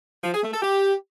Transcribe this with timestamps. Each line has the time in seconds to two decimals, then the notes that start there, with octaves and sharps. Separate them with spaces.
0.24 F3
0.34 G#4
0.43 A3
0.53 A4
0.62 G4